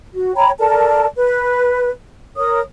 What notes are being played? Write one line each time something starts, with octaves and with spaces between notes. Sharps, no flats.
F#4
C#5 G5 A#5 B5
A4 A#4 D5 A5
B4
A#4 C#5 D#6